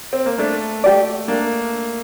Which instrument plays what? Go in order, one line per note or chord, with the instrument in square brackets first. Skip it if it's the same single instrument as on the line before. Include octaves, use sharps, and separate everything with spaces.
[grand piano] C4
A#3
[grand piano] A3 [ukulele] D4
[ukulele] G4 D5
[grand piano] A#3 [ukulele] D4